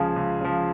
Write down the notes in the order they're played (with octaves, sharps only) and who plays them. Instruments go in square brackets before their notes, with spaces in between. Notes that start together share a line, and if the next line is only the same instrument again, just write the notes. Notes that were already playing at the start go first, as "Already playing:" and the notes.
Already playing: [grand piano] C#2 C#3 F3 G#4
C#2
C#3 F3